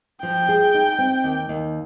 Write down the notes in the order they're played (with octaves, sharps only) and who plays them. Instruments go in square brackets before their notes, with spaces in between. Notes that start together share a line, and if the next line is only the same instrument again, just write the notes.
[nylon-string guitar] F3 [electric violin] G5
[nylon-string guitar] G#4
D#4
C4
D#2
D#2